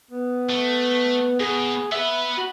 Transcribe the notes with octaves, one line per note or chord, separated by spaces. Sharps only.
B3
A3
B2 G#4
B3 B4 E5
F#4